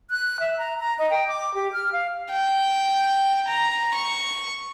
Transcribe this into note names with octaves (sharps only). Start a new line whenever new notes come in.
F#6
E5
A#5
A#5
D#5
G5
D6
G4
F6
F5
G5
A#5
C#6